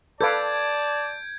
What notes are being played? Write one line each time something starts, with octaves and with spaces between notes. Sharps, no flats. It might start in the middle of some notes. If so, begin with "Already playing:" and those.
A4 B4 D5 F5 A5 G6 G#6 D7